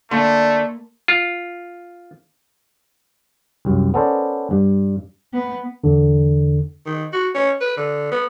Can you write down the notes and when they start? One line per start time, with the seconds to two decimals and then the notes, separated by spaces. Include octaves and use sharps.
0.11 D3 A3 A#3 D4 A5 C6
1.08 F4
3.65 C2 F#2
3.94 B3 C#4 A4 A#4 C5 D5
4.51 G2
5.34 B3
5.84 E2 D3
6.86 D#3
7.13 F#4
7.35 C#4
7.61 B4
7.77 D3
8.12 B3